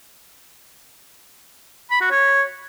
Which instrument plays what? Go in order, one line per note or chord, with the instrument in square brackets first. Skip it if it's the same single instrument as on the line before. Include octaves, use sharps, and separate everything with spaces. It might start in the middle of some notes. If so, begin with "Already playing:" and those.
[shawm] B5
F#4
C#5